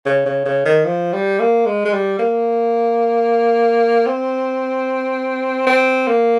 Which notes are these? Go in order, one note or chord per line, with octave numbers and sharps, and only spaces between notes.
C#3
C#3
C#3
D#3
F3
G3
A#3
G#3
G#3
G3
A#3
C4
C4
A#3